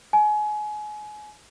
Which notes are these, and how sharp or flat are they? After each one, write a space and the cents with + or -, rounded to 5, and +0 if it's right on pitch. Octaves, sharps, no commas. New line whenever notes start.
G#5 +30